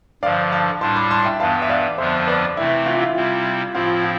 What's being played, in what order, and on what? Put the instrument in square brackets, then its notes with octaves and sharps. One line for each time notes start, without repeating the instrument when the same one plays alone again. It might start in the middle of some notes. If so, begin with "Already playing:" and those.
[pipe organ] G2 D3 F3 [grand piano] D5 F5
[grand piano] F5 A5
[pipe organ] A2 G3 D4 [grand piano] A5 C6
[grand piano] B5 D6
A5 C6
E5 G5
[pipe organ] G2 E3 B3 [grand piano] F5 A5
[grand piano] E5
D5 F5
[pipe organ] F2 D3 F3 B3 D4 [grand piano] C5 E5
[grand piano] B4 D5
[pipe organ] C3 E3 A3 C4 [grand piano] E4
[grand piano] F4
E4
F4
[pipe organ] C3 G3 C4 E4
[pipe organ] A2 F3 C4 E4 [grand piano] F4
[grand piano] F4